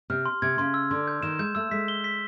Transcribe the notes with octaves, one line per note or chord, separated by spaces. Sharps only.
C3 F6
C6
C3 G#6
C#3 C6
E6
D3 C6
G6
D#3 E7
G#3 G6
A3 E6
G#3 B6
G7
B6